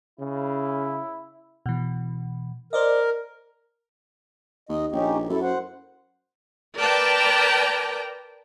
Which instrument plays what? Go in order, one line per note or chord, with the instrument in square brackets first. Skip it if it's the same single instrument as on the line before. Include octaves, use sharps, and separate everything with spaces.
[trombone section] C#3 [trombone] E4
[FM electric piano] B2 E3
[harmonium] A#4 [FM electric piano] C5 D5 D#5
[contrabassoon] D#2 [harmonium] D#5
[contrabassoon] A#1 [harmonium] C#4 D#4 G4
[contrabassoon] F#2 [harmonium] E4 A4
[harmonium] C5 F#5
[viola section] A#4 B4 D5 G5 A5 A#5